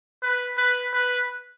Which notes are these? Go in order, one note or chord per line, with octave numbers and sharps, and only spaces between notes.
B4
B4
B4